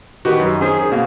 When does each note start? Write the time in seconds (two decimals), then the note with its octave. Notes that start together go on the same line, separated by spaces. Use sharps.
0.25 D#3 F#4 G4 B4
0.40 F#2
0.61 C#4 G#4 C5
0.92 B2 A#3